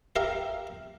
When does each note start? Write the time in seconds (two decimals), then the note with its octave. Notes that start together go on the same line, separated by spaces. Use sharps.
0.16 G4 A#4 E5 F5